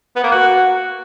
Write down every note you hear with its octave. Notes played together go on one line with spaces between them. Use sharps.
B3
A#3
F#4